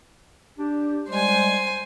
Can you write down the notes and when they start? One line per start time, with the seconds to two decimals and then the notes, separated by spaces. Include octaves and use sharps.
0.59 D4 G4
1.09 G3 G#3 C5 G#5